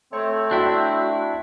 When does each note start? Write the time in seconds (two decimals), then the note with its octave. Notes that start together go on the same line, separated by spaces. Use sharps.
0.13 A3 C4 C#5
0.51 D4 E4 F#4 E5 G5 F#6